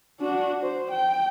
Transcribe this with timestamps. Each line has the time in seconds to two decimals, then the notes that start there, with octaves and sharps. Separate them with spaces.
0.20 D4 F#4
0.62 C5
0.91 G5